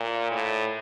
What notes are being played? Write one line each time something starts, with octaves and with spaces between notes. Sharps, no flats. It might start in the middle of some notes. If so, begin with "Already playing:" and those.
Already playing: A#2
A2